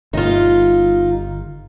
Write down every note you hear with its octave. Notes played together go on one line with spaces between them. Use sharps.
G1 D#4 F4